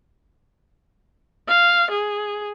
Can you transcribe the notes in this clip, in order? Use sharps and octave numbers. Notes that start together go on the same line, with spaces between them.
F5
G#4